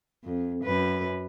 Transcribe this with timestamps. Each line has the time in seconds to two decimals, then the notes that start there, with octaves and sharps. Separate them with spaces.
0.24 F2
0.64 F#2 B4